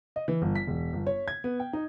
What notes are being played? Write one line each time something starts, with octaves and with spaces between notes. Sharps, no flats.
D#5
E3
G1
B6
E1
G1
C#5
G#6
B3
G5
D#4